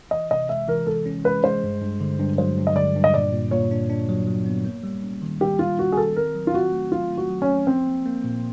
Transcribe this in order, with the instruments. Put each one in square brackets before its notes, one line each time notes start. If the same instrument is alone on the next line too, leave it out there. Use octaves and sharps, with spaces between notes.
[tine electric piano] E3 [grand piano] D#5
[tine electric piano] C3 [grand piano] D#5
[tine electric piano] G#3 [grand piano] E5
[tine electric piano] E3 [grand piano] A#4
[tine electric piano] G#3 [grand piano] A4
[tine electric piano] C#4
[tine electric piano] G#3 [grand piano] B4
[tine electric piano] G#3 [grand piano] C5
[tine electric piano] G2
G2
D3
G2
[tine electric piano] F#3 [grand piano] C5
[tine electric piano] G2
[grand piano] D#5
[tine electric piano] D3 [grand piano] D5
[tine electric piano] G2
[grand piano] D#5
[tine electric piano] A#2 [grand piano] D5
[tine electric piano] A#2
[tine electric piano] A#2 [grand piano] C#5
[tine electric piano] D4
D4
F#3
F#3
B3
A#3
G3
C#4
D#3
[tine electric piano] G3 [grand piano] G4
[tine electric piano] G3 [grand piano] F4
[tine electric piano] C#4 [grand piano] F#4
[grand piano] G#4
[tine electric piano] D#3 [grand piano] A4
[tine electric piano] C4 [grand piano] A#4
[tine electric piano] F#3
[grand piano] F4
[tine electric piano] C4 [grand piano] F#4
[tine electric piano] A3
[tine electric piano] F#3 [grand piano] F4
[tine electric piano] A3
[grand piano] F#4
[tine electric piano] F#3
[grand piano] C#4
[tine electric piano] A3
[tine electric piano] F3 [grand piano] C4
[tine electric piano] A#3
A#3
A#2